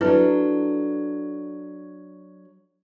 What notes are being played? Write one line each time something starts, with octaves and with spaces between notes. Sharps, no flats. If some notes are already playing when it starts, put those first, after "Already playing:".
F#3 D4 E4 A4 B4